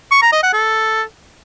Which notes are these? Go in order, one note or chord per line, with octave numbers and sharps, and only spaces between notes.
C#6
A#5
D#5
F#5
A4